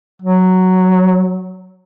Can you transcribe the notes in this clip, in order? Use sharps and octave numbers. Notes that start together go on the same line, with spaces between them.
F#3